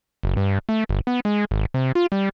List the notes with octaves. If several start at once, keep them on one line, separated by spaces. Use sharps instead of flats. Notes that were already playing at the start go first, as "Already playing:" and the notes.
F#1
G2
A3
G1
B3
G#3
G#1
C3
F4
G3